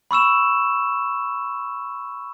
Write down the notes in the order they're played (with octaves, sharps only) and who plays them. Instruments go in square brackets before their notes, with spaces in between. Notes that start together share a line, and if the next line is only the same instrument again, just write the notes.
[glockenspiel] B5 C#6 E6 E7